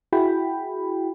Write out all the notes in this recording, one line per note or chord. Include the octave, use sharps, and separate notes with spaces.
E4 F#4 G#4 G5 B5